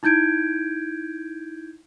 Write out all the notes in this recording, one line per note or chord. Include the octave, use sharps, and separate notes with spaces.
D#4 E4 G6 G#6 D7